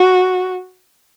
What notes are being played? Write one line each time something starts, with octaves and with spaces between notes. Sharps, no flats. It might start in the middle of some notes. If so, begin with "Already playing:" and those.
Already playing: F#4